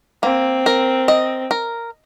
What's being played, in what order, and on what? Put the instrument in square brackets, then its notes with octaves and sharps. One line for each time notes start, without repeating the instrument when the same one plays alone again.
[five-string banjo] A#3 [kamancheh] C4
[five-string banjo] A#4
D#5
A#4